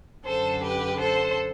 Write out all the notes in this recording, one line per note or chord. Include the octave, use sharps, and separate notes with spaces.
F#2 D3 A4 C5
G4 B4
A4 C5